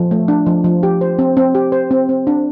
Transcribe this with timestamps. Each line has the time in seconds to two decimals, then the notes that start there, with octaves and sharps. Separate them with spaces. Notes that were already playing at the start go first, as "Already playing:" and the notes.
Already playing: F3
0.11 A3
0.28 D4
0.46 F3
0.64 F3
0.83 G4
1.01 C5
1.19 C4
1.37 C4
1.55 G4
1.72 C5
1.91 C4
2.09 C4
2.27 D4